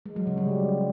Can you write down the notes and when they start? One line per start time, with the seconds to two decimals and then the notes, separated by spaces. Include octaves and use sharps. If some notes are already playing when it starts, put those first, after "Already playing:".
0.06 G#3
0.16 F#3
0.27 C#3
0.38 G3